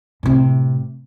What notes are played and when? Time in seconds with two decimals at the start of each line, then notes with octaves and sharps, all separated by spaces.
0.23 A2 C3